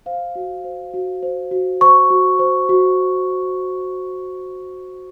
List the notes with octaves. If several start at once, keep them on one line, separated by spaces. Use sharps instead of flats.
C5 F5
F#4
C5
F#4
C5
F#4
C5 C#6
F#4
C5
F#4